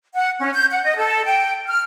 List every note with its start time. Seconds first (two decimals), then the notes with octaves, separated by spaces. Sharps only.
0.15 F#5
0.39 C#4
0.54 G6
0.71 F#5
0.83 D#5
0.97 A4
1.25 G5
1.68 F6